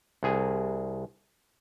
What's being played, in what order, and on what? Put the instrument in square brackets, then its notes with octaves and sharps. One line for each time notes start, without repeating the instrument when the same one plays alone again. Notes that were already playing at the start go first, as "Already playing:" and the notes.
[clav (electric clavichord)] C2 G#4